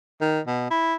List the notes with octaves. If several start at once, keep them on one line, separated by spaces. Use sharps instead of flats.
D#3
B2
E4